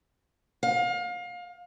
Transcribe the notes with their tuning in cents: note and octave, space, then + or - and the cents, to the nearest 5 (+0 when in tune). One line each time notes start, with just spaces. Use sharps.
F5 +30